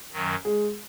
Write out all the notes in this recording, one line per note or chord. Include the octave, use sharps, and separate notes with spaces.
F#2 D#3 F#3
G#3 G#4